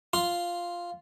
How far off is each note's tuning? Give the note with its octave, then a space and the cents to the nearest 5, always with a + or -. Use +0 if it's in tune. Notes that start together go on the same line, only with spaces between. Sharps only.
F4 +0 C6 +0